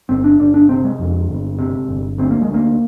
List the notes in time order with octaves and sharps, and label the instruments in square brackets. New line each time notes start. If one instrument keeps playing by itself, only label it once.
[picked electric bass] G1 C4
D4
G1 D4
D4
C3 C4
G#3
F2
G1
C3
G1
D2 C4
A#3
G#3
D2 A#3